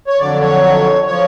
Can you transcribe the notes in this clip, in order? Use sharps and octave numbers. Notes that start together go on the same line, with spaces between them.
C#5
F2 D3 F#3 D5
C#5
F3 C#5